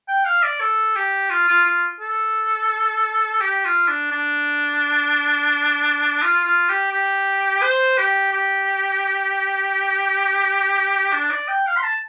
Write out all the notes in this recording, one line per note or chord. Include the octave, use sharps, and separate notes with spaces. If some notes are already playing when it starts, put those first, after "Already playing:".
G5
F5
D5
A4
G4
F4
F4
F4
A4
G4
F4
D4
D4
F4
F4
G4
G4
C5
G4
G4
D4
D5
G5
F5
C6
A5